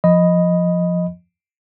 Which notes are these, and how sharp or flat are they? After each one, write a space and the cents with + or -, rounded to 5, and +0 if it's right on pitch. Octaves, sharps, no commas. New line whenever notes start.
F3 +0 D#5 +0 B5 +0